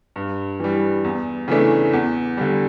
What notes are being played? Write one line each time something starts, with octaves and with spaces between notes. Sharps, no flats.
G2
E3 G3
E2
C#3 E3 A3 D4
E2
D3 G3